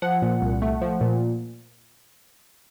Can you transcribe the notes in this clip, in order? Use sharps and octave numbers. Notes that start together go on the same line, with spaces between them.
F3 F#5
A#2
C2
A3
F3
A#2